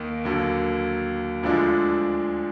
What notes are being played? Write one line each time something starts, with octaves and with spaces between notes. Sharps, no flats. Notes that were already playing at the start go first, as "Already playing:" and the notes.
Already playing: D#2 D#3 A#3 D#4
D#2 D3 F#3 A#3
D2 D3 F3 G#3 D4